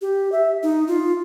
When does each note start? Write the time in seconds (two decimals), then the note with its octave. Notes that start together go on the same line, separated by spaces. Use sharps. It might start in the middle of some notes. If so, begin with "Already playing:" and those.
0.02 G4
0.32 E5
0.63 D#4
0.88 F4